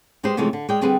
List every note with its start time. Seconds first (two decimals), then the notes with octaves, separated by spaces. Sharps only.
0.23 G3 G#3 G4 B4 C5
0.37 C3 E3 F3 G#3 A3 C#4
0.53 D3
0.69 G#3 D5 G5
0.81 D3 G3 C4 G#4 B4